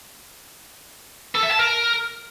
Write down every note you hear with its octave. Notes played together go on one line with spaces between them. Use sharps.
A4
E5
A5
A#4